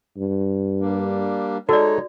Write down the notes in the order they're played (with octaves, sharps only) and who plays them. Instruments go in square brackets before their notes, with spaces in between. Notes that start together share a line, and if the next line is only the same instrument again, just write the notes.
[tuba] G2
[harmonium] G3 A#3 D4
[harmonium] G#3 D#4 C#5 [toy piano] F#4 D5 [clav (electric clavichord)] A4